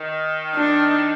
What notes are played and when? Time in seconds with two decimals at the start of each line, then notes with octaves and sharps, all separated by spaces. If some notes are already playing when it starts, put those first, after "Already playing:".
Already playing: D#3
0.56 D4